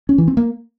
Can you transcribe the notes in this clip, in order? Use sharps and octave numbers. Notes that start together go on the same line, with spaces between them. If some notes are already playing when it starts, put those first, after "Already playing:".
C#4
E3
C4
A#3